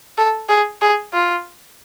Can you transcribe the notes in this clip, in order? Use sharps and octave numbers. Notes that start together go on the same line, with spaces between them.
A4
G#4
G#4
F4